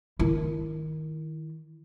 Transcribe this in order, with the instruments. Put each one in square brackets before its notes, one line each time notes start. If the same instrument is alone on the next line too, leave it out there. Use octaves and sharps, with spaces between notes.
[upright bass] D#3 E4